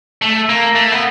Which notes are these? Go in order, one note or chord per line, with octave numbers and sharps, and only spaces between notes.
A3
A#3
A3
B3